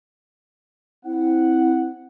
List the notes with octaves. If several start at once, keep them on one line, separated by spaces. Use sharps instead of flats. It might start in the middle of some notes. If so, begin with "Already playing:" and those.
C4 E4 F#5